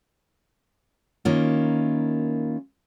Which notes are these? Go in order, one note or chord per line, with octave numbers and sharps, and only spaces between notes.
D#3 A#3 C#4 E4 F4